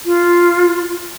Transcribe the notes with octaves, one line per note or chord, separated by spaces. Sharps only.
F4